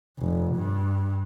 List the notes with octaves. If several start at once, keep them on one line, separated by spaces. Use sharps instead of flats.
F1
G2